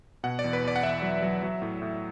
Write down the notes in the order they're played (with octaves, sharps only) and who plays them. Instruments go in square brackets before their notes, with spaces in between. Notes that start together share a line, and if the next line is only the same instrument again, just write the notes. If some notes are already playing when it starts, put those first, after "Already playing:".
[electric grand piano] B2 F#5
D5
E2
B4
E2 D5
F#5
E2 E5
F#3
F#3
F#3
A2
A2